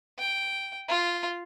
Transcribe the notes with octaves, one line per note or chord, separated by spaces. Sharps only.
G5
F4